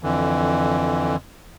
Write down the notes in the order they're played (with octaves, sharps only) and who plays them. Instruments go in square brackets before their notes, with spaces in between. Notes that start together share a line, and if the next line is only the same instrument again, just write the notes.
[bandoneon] F2 D3 E3